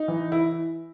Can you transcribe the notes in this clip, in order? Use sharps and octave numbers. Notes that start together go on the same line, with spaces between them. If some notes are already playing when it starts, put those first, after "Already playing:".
Already playing: D#4
E3
E4